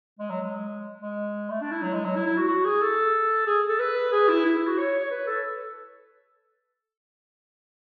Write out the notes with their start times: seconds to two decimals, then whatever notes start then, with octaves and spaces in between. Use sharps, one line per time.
0.19 G#3
0.30 F#3
0.41 G#3
1.01 G#3
1.50 A3
1.61 D4
1.71 E4
1.82 F#3
1.93 G#3
2.05 F#3
2.16 E4
2.26 E4
2.38 F#4
2.48 F#4
2.65 G#4
2.81 A4
3.47 G#4
3.69 A4
3.79 B4
4.12 G#4
4.28 E4
4.45 E4
4.56 E4
4.67 F#4
4.78 C#5
4.99 C#5
5.11 B4
5.27 A4